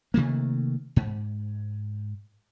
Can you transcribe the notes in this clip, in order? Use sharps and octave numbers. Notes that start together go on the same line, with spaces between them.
C3 D#3 A3 A#3
G#2